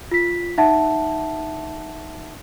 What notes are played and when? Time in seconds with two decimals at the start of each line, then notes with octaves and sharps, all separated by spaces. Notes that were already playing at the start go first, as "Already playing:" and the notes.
0.11 F4 B6
0.58 D#4 E5 F#5 A5